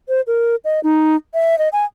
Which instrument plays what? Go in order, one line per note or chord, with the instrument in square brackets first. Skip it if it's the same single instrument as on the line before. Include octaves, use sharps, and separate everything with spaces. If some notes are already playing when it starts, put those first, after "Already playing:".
[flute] C5
A#4
D#5
D#4
E5
D#5
G#5